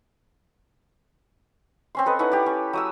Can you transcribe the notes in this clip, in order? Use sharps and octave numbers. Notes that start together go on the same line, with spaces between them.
C4 C#4 C6
A4 B4 D#5
C#4 D#4 E4 F#5
G4 D5
C#4
F#3 D#6 E6